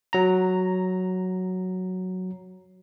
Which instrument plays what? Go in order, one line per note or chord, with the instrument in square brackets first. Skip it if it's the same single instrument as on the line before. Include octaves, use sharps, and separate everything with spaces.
[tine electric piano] F#3 A#5